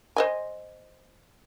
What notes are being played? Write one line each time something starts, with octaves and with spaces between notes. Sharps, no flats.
C5 D#5 G#5